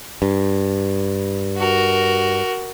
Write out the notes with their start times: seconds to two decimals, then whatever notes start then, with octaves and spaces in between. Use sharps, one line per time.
0.22 G2
1.58 F#4 A#4